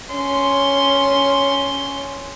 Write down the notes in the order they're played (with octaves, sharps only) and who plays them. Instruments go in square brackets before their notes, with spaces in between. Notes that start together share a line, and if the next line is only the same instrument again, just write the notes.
[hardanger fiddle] C#4 C6